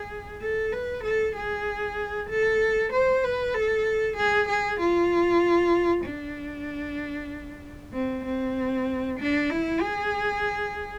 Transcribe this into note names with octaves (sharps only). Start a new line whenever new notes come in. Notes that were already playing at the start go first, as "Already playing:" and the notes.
Already playing: G#4
A4
B4
A4
G#4
A4
C5
B4
A4
G#4
G#4
F4
D4
C4
C4
D4
E4
G#4